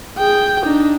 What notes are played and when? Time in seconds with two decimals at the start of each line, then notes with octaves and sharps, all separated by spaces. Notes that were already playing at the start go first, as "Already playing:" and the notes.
0.18 G#4 G5
0.65 D4 D#4